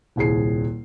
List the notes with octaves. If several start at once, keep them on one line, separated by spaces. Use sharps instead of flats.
D#1 C2 G#4 C7